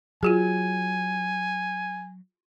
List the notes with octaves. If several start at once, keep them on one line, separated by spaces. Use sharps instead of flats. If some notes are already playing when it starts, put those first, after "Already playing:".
F#3 F4 F#4 G#4 G#5